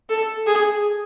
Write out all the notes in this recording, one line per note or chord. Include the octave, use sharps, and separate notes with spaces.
A4
G#4